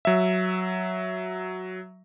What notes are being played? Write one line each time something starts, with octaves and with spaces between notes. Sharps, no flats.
F#3 E5